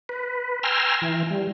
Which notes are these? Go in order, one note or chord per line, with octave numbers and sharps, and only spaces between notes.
B4
G5 G#5 A#5 C6 E6 F6
E3
G3